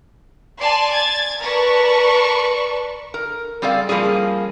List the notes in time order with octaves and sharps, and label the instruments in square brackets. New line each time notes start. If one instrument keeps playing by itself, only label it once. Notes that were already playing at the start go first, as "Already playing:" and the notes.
[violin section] D5 G#5 A5 C6
G#6 A6
A#4 B4 D5 A5 C#6
[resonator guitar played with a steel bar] A#4
G3 C4 G#4 A4 D5 F5
F3 G3 A#3 C#4 G#4